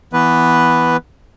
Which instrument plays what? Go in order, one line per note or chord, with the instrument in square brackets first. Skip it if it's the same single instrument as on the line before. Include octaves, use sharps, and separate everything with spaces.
[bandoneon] E3 B3 B4